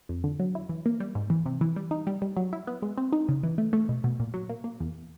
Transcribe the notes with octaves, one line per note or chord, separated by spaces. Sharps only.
F2
D3
F#3
E4
E3
A#3
G3
G#2
E3
C3
E3
G3
D#4
G3
G3
F#3
E4
B3
G#3
C4
D#4
C#3
E3
A3
A3
B2
B2
A#2
F#3
A#3
A#3
E2